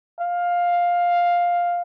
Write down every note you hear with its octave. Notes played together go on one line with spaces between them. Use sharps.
F5